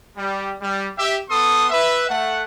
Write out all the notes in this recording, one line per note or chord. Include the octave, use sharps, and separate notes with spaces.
G3
G3
G4 E5
B3 A4 C6 D#6
B4 E5
A3 F#5